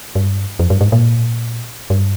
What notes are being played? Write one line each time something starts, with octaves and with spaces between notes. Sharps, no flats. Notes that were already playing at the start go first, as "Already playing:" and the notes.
G2
F2
G2
G#2
A#2
G2